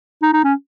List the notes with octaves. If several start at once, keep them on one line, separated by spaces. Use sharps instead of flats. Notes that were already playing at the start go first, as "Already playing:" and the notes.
D#4
D#4
C#4